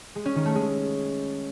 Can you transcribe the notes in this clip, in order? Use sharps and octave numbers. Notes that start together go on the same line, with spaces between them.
G#3
C#4
D#3
A3
G#3